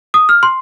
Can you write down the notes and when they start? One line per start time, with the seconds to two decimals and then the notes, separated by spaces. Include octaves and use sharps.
0.14 D#6
0.29 F6
0.43 C6